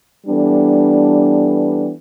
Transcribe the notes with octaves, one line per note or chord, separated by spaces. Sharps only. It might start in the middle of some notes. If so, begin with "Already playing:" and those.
E3 G3 B3 D4 A4